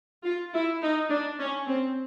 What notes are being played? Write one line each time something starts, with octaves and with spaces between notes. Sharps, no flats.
F4
E4
D#4
D4
C#4
C4